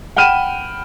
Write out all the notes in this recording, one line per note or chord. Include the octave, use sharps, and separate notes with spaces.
F#5 G5 B5 F6 D#7 E7